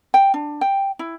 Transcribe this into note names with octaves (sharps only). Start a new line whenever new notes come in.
G5
D4
G5
E4